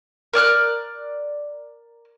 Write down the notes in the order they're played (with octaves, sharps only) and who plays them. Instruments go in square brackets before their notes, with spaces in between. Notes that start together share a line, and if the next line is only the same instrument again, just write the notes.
[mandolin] A#4 D5 F6 F#6